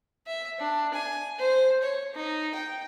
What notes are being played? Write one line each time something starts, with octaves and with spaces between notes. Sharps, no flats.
E5
D4
G#5
C5
C#5
D#4
G5